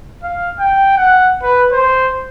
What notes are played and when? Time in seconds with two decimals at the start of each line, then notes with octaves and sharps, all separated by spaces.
0.23 F5
0.59 G5
0.97 F#5
1.43 B4
1.72 C5